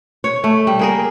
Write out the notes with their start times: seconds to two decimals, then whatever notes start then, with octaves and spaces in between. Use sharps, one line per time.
0.24 C#5
0.44 A3
0.67 G3
0.79 A#3 G#4 A#4